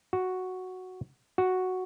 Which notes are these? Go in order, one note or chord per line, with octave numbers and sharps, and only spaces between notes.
F#4
F#4